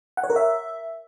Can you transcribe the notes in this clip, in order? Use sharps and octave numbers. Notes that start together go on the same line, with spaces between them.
F#5
C#5
A#4
E5